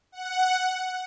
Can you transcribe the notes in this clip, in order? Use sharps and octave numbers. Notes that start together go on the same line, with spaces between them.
F#5